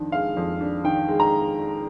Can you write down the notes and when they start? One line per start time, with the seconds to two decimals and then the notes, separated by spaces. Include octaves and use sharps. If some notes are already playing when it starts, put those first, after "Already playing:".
Already playing: F2 D#3 D4
0.12 G#3 F5
0.37 F2
0.61 D4
0.84 D#3 G5
1.08 G#3
1.20 A#5